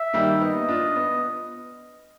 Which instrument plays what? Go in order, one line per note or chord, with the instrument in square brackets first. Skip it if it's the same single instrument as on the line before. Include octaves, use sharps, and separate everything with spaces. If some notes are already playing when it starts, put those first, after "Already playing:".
Already playing: [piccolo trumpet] E5
[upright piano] D#3 G3 A#3
[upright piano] B3 [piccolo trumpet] D#5
[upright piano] D4 F4
B3